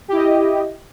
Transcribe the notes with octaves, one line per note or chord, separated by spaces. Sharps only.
E4 G4 D#5